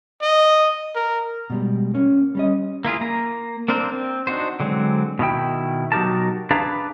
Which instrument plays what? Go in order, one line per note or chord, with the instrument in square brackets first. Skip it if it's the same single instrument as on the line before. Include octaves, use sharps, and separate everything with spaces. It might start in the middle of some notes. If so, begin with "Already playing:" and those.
[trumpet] D#5
A#4
[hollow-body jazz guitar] B2 G3 G#3
A#3 C#4
G3 C#4 D#5
[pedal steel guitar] A#3 E4 F4 G#4
A#3 A#5
A#3 C4 D4 A#4 C5
C4
D4 D#4 F#4 C5
D3 F#3 G#3 C4
[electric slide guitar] B2 D#3 E4 G5
B2 F#3 D#4 G4 A#4 A5
D4 G#4 B4 F5 A5 A#5